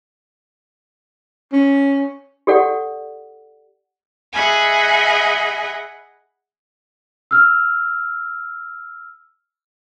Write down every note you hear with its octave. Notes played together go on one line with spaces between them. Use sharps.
C#4
G4 A4 D5 F#5
G#4 D#5 E5 F#5 G#5 B5
E6 F6